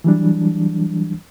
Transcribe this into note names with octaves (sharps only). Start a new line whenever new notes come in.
E3 F#3 G3 D4